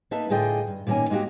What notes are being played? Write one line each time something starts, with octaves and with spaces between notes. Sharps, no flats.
A#3 D#4 B4 E5 A5
A2 D3 F4 G#4 D#5 G5
G2
A#2 D#3 A#3 C#4 G#5
G#3 A#3 D#4 F#4 G4